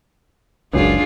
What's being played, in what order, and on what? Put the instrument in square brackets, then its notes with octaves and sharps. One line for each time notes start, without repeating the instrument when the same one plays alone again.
[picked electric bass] F#1 C#2 F#2 [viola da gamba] D4 F4 G#4